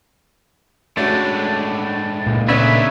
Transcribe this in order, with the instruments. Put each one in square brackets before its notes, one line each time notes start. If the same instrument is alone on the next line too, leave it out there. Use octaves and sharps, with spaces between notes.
[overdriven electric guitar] A2 G#3 [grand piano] A3 C#4 F#4 [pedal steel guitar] D4
[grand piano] C#2 [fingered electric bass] A#2
[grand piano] C#3 B3 D4 [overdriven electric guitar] A3 D#4 [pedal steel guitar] B4 C#5 E5